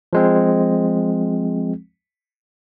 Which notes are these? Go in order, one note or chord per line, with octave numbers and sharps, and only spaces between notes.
F3 G#3 C4